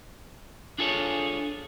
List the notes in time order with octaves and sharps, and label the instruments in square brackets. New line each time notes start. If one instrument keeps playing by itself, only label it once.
[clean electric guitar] D4 F4 G#4 A4 B4 C#5